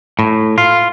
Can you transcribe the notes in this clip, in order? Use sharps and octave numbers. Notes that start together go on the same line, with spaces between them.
A2
F4